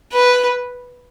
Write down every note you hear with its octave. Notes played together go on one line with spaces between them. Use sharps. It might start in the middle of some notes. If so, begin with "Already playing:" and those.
B4